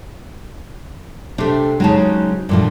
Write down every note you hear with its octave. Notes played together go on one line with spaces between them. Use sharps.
C3 A3 D4
C#3 F#3 G#3 D#4 A5
G2 A#2 D3 E3 F3